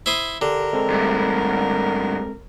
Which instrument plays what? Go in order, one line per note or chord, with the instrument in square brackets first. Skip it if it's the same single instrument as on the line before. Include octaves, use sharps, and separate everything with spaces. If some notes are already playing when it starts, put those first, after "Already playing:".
[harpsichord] E4 C5 D#6
[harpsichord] D3 [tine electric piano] G4 [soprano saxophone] A#4
[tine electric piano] G#3 C4 A4
[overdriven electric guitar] G2 A3